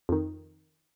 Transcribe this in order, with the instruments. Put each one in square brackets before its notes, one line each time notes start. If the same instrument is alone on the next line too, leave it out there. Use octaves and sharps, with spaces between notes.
[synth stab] F2 D#3